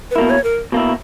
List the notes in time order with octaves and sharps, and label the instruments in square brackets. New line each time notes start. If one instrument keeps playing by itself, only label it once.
[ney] B4
[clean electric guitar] B2 A#3 E4 [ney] A#4
[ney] C#5
A#4
[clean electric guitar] B2 A#3 E4